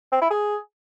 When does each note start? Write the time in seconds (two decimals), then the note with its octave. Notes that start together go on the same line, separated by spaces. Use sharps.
0.12 C4
0.21 E4
0.31 G#4